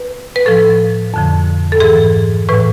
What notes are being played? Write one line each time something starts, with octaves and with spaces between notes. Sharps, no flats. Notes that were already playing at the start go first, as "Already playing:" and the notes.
Already playing: B4
B4
A2 F3 A4
F2 D3 F3
A4
G#2 E3 G#4
A2 E3 B4